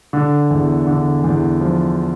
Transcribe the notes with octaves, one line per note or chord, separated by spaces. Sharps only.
D3
E2
D3
E2
F3